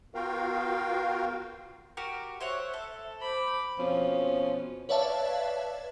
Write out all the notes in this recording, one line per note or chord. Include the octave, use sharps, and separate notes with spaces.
B3 F4 F#4 A#4 F5 G5
F#4 G4 A#4
C5 C#5 E5 F#5
A4
C5 B5 D6
F2 B2 F3 C#4
B4 C#5 D5 E5 F5 A5